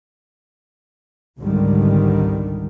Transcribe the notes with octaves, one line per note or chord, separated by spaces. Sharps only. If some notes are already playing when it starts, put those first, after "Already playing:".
G#1 C#2 G#2 D3 D#3 G3